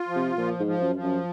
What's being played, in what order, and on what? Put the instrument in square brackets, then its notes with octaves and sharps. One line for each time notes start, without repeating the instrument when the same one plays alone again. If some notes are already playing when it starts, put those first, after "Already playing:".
Already playing: [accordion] F4
F3
[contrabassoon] C3
[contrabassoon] A#2 [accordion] F3
[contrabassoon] G#2
[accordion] F3
[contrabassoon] F#2
[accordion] F3
[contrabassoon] F#2